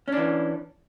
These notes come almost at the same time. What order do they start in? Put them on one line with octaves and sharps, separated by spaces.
C#4 D4 E3